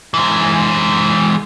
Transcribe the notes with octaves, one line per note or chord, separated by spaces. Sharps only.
E3 G#3